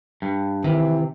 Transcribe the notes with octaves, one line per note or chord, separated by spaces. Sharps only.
G2
C3 D#3 E3